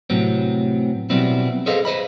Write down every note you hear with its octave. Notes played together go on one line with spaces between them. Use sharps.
A2 C3 F#3 B3 C4
B2 F#3 G3 B3 C4 E4
G#4 A4 B4 C5 D#5 F5
B4 C5 D#5 B5